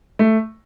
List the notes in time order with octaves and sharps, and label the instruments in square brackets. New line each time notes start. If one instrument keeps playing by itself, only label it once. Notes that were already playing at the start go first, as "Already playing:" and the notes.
[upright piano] A3